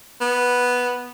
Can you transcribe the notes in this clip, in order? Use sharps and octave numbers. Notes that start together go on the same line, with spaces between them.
B3